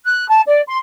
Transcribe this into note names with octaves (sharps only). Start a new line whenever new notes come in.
F#6
A5
D5
C6